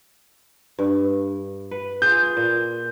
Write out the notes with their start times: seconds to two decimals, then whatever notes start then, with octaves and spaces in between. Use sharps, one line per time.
0.79 G2
1.71 B4
2.02 F4 G#4 G6
2.37 A#2